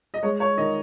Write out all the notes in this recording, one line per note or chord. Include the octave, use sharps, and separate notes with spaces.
D#5
G#3 C#5
C#5
D#3 D#5